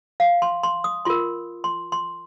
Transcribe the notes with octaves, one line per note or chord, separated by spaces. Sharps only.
F5
C6
C6
D#6
F4 A#4 C6
C6
C6